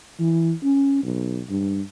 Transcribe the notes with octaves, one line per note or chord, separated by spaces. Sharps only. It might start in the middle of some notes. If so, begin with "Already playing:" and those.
E3
C#4
B1
G2